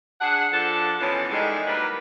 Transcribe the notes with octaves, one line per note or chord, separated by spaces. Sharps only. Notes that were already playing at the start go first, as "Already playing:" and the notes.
D4 G#4 F#5
F3 D4 A4
B2 E3 F3 B3 C#4 A4
A2 D#3 G3 G#3
F#3 G3 A#3 B4